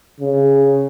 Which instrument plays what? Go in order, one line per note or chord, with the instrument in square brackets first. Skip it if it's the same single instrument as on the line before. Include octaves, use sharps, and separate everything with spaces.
[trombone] C#3